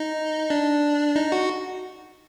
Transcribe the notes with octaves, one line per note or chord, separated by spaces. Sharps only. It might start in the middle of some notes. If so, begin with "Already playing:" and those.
Already playing: D#4
D4
D#4
F#4